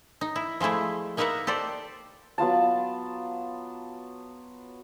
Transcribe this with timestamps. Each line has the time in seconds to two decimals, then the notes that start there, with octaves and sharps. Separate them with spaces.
0.21 D#4
0.36 E4
0.60 F3 G#3 A3 E4 G#4
1.17 A#3 D#4 A#4 B4 E5 F#5
1.47 G4 A4 C5 D5
2.38 F#3 B3 F4 A5